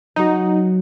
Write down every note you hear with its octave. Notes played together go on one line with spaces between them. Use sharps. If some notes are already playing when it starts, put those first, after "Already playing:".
F#3 D#4 F#4